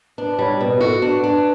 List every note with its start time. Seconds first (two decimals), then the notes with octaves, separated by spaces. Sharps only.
0.18 D4 B4
0.39 G3 C#5
0.60 B2 B4 C#5
0.81 F#4 A4
1.02 D4 B4
1.24 D4